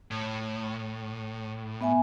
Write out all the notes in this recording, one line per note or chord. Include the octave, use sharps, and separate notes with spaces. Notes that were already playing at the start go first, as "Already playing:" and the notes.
A2
B3 E5 G#5